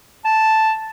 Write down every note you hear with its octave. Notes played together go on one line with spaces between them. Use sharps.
A5